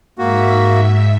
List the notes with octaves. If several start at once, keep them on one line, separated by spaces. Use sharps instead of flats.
G#2 A#3 F#4 E5 B6